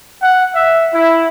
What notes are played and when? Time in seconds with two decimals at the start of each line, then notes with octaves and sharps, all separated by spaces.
0.21 F#5
0.55 E5
0.93 E4